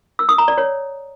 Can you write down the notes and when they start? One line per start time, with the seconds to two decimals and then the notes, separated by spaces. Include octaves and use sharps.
0.19 E6
0.29 D#6
0.38 A#5
0.48 D5
0.58 C#5